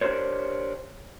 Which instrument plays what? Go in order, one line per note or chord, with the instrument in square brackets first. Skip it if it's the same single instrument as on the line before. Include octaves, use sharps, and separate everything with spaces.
[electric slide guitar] D4 G4 A#4 C5 C#5